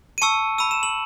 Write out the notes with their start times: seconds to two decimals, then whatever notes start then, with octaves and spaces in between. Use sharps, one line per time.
0.18 D#7
0.22 A5 C#6 E6 C#7
0.58 B5 E6 D#7
0.71 E7
0.83 F#7